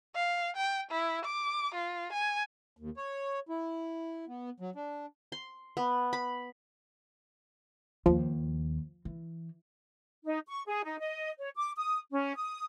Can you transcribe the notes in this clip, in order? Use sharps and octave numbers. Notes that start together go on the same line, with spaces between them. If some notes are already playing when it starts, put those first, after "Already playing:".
F5
G5
E4
D6
F4
G#5
D#2
C#5
E4
B3
F#3
D4
C6
B3
B5
D#2 F3
E3
D#4
C#6
G#4
D#4
D#5
C#5
D6
D#6
C#4
D#6